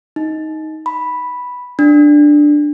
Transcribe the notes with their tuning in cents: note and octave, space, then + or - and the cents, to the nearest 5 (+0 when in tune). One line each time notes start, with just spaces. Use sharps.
D#4 +10
B5 +0
D4 +5